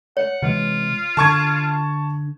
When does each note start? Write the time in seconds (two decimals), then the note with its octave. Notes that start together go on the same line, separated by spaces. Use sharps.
0.17 C#5 F#5
0.42 C3 E3 G#3 F4
1.17 D3 D4 A5 C#6 G#6